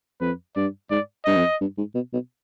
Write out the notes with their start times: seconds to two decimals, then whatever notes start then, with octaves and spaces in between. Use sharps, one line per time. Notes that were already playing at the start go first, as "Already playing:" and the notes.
0.21 F2 B4
0.56 G2 D5
0.90 G#2 D5
1.25 G2 D#5
1.37 F2
1.61 G2
1.78 G#2
1.95 B2
2.13 B2